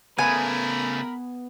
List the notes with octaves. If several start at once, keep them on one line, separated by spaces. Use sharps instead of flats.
C#3 A3 B3 A#4 G#5 B5